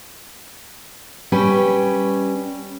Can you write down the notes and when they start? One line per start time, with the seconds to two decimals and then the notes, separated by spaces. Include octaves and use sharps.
1.32 G3 C#4 B4 G5